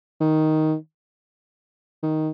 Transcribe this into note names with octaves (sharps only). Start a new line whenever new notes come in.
D#3
D#3